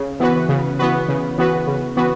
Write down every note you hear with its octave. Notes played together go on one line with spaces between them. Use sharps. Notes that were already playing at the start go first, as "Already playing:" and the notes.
Already playing: C#3
E3 B3 F#4 B4
C#3
E3 B3 F#4 B4
C#3
E3 B3 F#4 B4
C#3
E3 B3 F#4 B4